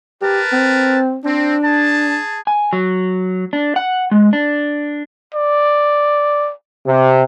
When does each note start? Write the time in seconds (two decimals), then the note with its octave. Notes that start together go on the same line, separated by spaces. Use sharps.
0.22 G4 A#4 B4 A5
0.53 C4
1.25 C4 D4
1.62 G#4 A5
2.47 G#5
2.73 F#3
3.53 D4
3.76 F#5
4.11 G#3
4.33 D4
5.34 D5
6.87 C3